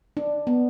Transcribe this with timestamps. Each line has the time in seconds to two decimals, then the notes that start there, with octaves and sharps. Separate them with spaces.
0.17 D4
0.47 B3